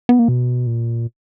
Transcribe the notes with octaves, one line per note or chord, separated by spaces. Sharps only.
B3
A#3
B2
A#2